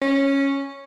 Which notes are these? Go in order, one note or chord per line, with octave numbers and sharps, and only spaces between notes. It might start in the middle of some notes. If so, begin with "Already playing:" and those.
C#4